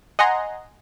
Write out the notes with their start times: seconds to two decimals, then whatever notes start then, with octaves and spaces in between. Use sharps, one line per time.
0.19 D#5 F#5 G#5 A#5 C6